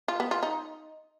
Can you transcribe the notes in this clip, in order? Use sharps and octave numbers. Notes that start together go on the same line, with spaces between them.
F4
B3
F4
D#4